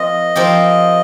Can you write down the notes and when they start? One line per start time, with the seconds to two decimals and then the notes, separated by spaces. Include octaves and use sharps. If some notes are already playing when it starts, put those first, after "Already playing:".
Already playing: F3 C4 A#4 D#5
0.36 F3 C4 G4 A#4